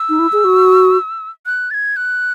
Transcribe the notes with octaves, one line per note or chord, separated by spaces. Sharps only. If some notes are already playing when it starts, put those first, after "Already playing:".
Already playing: E6
D#4
E4
G#4
F#4
F#6
A6
G#6
F#6